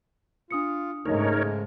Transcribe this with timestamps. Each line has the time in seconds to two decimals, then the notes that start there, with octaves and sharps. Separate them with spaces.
0.51 D4 F4 D#6 C#7
1.05 G#2 C#3 G#3 A3 D#4 A#4 C#5